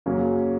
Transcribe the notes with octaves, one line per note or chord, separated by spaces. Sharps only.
F#2 C#3 F#3 A#3 C#4